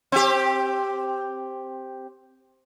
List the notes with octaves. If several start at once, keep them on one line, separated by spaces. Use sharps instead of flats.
C4 G4